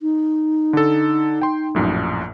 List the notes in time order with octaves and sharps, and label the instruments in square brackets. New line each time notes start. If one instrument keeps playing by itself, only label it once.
[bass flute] D#4
[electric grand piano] D3 A4
G5 C6
A#1 F#2 A2